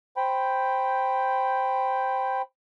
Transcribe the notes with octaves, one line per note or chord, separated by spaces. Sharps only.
C5 G5 B5